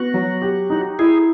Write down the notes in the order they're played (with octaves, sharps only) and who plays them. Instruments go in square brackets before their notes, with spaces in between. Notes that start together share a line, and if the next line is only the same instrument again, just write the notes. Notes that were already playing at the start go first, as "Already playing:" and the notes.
Already playing: [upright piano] B3 [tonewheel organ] F#4
[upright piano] F#3
G4
D#4
[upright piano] E4 [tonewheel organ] G#4